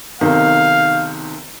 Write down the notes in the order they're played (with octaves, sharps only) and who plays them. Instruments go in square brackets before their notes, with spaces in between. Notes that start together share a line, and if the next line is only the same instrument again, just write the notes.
[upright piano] B1 C3 D#3 [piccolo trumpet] F5